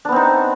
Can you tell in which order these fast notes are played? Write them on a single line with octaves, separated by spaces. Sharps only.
D4 B3 C4 D#4